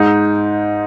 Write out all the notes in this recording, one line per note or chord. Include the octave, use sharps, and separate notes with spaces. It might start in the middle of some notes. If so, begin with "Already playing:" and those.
Already playing: G#2 G#3 D#4